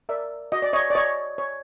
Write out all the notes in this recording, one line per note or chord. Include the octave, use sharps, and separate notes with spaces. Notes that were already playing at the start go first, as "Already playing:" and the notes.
A#4 D5 E5
F#4 D#5
D5
C#5 D#5
D5
C#5 D#5
C#5